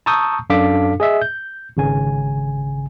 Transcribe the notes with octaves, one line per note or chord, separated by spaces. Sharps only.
A5 A#5 C#6 D#6 E6 G6
F#2 D4 A4 F5 D6 B6
G#4 D#5 E5
G6
G#1 C#3 G#5